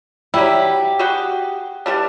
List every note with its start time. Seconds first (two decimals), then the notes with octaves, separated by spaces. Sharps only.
0.34 F#3 G3 E4 G4
0.99 F#4 G#4 G5
1.86 E3 G3 D4